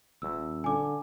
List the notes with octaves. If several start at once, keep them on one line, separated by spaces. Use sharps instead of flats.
D#1 E6
D3 G#5 D6